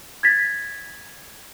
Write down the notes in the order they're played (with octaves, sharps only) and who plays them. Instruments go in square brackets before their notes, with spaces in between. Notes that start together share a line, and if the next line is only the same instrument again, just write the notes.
[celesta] G#6 A6 B6